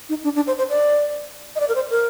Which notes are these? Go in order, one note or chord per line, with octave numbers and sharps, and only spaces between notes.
D#4
D4
D4
C5
C5
D5
D#5
D5
A#4
C5
A#4